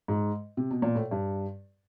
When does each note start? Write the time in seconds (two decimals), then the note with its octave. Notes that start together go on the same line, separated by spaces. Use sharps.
0.08 G#2
0.57 C3
0.71 B2
0.82 A#2
0.95 A2
1.11 G2